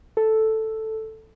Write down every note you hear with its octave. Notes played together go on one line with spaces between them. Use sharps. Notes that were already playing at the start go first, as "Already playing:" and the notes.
A4